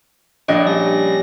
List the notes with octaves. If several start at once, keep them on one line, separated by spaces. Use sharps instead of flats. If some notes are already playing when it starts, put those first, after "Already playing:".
A#1 D4 C#5 D#5 G5 G#6
G3 C#4 A#6